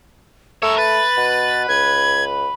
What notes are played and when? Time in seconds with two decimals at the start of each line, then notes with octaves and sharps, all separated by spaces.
0.63 A3 A#4 C#5 E6
0.78 B4 A6
1.17 B2
1.69 C#2 G#6